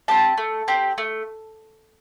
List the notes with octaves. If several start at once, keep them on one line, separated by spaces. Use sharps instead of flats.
C4 G4 A5
A3
C4 G4
A3